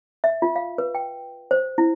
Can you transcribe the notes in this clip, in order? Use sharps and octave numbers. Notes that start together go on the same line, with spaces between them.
E5
F4
F5
B4
G5
C5
E4